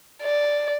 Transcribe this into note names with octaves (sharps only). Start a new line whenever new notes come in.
D5